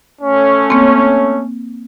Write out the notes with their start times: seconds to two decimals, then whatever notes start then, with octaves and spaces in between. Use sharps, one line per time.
0.21 A3 C#4
0.70 A#3 C4